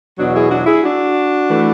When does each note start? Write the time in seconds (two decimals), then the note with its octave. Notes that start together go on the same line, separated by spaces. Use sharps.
0.17 E2 B2 F#3 D4 F#4
0.34 E4 G#4
0.50 D4 F#4
0.66 E4 G#4
0.83 D4 F#4
1.49 E3 A3